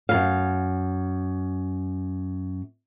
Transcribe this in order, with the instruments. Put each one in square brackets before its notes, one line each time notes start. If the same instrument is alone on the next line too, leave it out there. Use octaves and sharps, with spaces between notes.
[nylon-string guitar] F#2 E3 F5